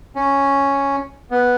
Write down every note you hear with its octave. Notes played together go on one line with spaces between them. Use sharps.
C#4
B3